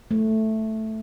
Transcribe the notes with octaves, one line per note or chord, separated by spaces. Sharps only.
A3